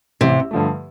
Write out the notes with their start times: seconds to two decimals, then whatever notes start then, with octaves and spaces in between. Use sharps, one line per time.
0.21 A1 C3
0.51 G2 D3 F3 A3